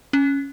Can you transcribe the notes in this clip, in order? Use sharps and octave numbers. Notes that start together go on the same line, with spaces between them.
C#4